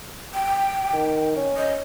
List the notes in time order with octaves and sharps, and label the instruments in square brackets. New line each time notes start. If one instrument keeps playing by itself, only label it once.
[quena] G5
[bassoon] D#3
C#4
[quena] D#5